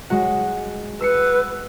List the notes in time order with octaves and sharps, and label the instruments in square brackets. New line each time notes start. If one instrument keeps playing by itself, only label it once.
[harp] G#3 F#4 F#5
[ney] B4 [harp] E6 C7 C#7